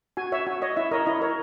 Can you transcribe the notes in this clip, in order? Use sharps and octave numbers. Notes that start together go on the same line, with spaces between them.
F#4 G#5
C#5 E5
F#4
C#5 D#5
E4 E5
A#4 C#5 D#5
E4 D#5
A#4 C#5